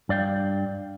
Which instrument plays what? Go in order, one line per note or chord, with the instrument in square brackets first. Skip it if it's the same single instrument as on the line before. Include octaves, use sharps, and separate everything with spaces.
[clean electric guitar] G2 D5 F5 G5